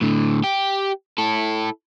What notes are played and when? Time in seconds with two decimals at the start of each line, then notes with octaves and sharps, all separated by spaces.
0.01 A2 D3
0.44 G4
1.18 E4 A4